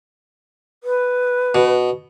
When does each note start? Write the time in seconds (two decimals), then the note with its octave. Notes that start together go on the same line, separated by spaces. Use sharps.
0.84 B4
1.55 B2